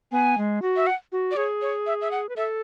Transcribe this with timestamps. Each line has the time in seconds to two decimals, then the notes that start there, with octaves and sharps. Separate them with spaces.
0.11 B3 G#5
0.38 G#3
0.62 F#4
0.76 E5
0.87 F#5
1.12 F#4
1.31 D5
1.36 G#4 C#5
1.61 C#5
1.86 E5
2.01 E5
2.11 F#5
2.29 B4
2.36 A4 E5